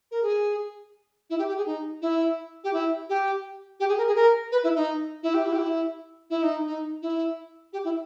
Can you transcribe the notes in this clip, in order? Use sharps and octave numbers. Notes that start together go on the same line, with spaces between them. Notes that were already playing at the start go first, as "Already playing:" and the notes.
A#4
G#4
E4
G4
G4
G#4
D#4
E4
G4
E4
G4
G4
G#4
A#4
G#4
A#4
B4
E4
D#4
E4
G4
E4
G4
E4
E4
D#4
D#4
E4
G4
E4